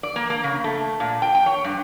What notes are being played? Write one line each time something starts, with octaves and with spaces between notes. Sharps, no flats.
D5
A#3
A#3
C#3
A3
A#2
G5
G5
C#5
G2